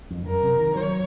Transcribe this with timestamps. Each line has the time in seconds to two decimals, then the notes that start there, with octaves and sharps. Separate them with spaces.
0.10 F2
0.26 F#2 A#4
0.43 C3
0.59 D#3
0.75 F#3 C#5